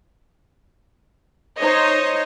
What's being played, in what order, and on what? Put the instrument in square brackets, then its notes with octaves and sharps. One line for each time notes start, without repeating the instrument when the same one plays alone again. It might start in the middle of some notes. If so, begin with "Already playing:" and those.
[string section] D#4 C5 C#5 D#5